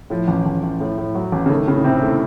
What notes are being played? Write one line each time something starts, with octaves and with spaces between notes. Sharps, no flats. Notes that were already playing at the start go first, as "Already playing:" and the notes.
A2 F3
A1
A1
A1
A2
A2
F#3
A1
C#3
D#3 A3
A2 C#3
C3 C4
A2 A3